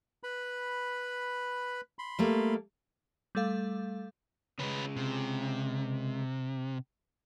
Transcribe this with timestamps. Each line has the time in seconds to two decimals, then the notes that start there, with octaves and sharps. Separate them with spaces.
0.23 B4 B5
1.99 B5 C6
2.19 G3 A3 A#3
3.35 G3 A3 A4 F5
4.59 C#3 G#3 C#4 B4
4.96 C3